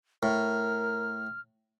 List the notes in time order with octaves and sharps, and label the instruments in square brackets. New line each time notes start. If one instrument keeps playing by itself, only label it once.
[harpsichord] A2 [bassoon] A#4 [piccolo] F6